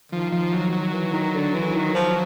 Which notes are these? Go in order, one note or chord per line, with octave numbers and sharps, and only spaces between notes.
D#3 F3
F3
F#3
F#3
E3
D#3
D3
E3
D#3
F3